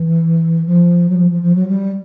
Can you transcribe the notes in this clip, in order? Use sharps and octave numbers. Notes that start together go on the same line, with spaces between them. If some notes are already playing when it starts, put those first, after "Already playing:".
Already playing: E3
F3
F#3
F3
F3
F3
F#3
G3